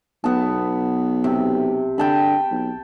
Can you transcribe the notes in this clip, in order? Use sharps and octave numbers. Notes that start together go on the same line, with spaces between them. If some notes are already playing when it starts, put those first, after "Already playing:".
B1 B3 A5
C3
D3 G5 A5 B5
B1